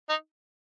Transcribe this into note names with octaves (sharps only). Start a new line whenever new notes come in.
D#4